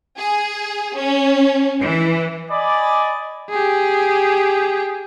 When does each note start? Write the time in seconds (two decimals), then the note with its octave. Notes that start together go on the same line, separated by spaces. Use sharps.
0.17 G#4
0.96 C#4
1.82 E3
2.50 D5 D#5 G#5 B5 D6
3.50 G4 G#4